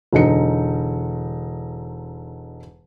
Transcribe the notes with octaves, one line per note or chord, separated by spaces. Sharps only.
E1 D3 D#4 C#7